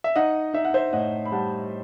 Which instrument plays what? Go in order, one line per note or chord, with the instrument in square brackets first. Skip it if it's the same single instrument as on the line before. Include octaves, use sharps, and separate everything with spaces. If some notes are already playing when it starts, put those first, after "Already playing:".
[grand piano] E5
D#4 D#5 F#5
D#4 E5
F#5
C5 E5
A2 D#5 F#5
B5
G3 F#5 A5